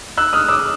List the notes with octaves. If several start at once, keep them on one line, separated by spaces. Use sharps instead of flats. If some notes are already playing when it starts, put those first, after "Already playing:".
E6 F#6
D#6 F6
D6 E6